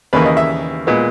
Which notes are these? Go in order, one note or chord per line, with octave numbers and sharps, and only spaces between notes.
D#2 C#3 E3 A#3 B4
D#5
E5
A#2 G#3 B3